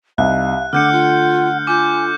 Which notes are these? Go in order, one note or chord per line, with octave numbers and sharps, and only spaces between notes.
C2 D#4 F5 F#6
D3 A3 F#5 D6 F6 G6 C#7
F4
F4 G#5 D6 G6